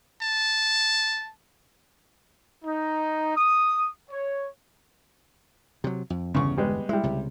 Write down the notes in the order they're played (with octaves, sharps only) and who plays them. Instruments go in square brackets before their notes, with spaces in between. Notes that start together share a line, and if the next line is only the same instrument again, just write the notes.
[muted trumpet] A5
[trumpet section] D#4
D#6
C#5
[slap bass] C3 F#3
F2
[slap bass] G1 E2 [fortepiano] C#3 C#6
[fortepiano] G3 G#3 B3
[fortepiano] G3 E4 [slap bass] G#3
[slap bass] C#2 C3